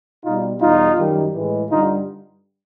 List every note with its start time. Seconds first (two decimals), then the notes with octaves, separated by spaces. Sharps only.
0.23 B2 G3 D#4 F4
0.60 E2 B2 G3 D#4 F4
0.97 F#2 D#3 G3
1.34 A2 E3 G#3
1.69 G2 D3 G3 D#4 F4